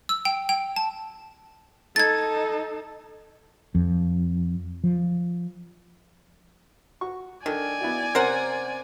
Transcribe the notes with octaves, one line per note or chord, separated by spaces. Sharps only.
E6
G5
G5
A5
D#4 A4 G#6 A6
F2
F3
F#4 C#6
D#3 D4 A4 D5 G#5
B3 E4 F#4
C3 C#4 A#4 C5 F#5